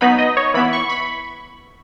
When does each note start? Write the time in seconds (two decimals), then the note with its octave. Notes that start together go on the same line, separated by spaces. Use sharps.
0.01 F#3 B3 D#4 B5
0.18 D#5
0.37 C#5
0.54 E3 B3 E4 B5
0.73 C#6
0.89 B5